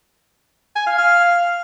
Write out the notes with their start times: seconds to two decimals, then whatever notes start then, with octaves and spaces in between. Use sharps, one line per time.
0.76 G#5
0.87 F5
0.98 F5